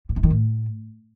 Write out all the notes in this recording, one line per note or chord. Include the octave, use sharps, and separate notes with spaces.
A#2
C3
D#3
A2